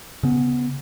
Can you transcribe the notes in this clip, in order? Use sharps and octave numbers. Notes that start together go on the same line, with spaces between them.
C#3 B3